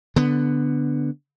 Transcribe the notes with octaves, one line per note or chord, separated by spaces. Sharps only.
D3 B3